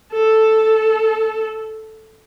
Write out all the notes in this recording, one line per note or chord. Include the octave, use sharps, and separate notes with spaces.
A4